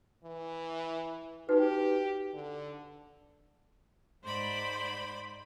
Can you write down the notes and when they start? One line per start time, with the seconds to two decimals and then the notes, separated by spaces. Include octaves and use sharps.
0.24 E3
1.49 D#4 F#4 G4 B4
2.33 D3
4.23 G#2 C5 D5 B5